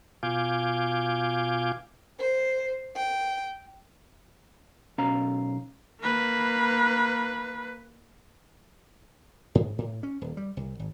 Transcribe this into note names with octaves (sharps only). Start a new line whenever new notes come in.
B2 F4 F5 G#5 D6 G6
C5
G5
B1 C#4 F5 A#5
A#3 B4
G#2
A2
C#4
D#1
G3
C2
G#1